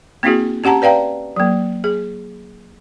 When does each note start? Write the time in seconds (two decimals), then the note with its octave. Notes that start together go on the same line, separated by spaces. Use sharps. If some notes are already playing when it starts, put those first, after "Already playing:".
0.23 A#3 C4 D4 E4 F#4 G#4
0.64 C#4 G4 F#5 A5 A#5
0.82 B4 D5 F5 G5 A#5
1.36 F#3 A#3
1.84 G#4